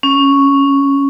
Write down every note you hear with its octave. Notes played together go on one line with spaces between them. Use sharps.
C#4